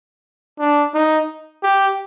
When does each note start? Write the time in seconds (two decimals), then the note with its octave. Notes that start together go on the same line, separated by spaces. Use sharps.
0.59 D4
0.94 D#4
1.63 G4